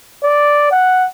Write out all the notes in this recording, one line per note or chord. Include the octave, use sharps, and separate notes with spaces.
D5
F#5